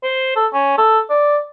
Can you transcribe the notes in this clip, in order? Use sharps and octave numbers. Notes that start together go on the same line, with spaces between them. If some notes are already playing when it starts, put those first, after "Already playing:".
C5
A4
C#4
A4
D5